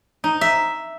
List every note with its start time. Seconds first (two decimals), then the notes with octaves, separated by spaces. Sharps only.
0.24 D#4
0.41 E5